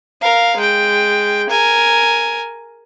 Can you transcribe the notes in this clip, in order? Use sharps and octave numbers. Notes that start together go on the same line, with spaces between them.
A#4 F5
G#3 G5
A#4 G#5